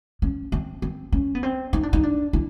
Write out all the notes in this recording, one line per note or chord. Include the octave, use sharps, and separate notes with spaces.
C#4
C4
C4
C#4
B3
C4
D#4
D4
D#4
D4
E4